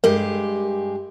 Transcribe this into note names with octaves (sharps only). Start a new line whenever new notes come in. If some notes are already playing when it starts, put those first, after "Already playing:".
G2 G#3 G4 A#4